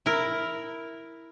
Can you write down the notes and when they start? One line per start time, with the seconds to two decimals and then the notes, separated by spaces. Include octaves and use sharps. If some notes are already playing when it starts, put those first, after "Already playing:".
0.06 E4 A#4